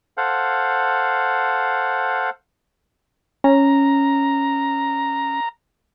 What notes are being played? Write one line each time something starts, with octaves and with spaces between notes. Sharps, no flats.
A4 C5 F5 F#5
C#4 A#5